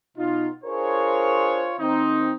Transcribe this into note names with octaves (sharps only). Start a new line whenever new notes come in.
B2 D#4 F4
D4 F4 G#4 A#4 C5 C#5
D#3 C4 D#4